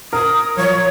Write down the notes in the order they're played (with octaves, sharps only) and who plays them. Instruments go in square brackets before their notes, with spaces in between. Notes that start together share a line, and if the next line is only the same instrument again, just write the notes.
[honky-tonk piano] A#4 [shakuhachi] D#6
[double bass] F3 F#3 [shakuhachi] C#5